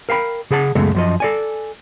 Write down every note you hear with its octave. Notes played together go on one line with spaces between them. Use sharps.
A#4 F5 G5 B5
C#3 G#4 F#5 A5
C#2 F#2 C#3 G#3 A3 B3
F#2 F3 D#5
A4 D5 G#5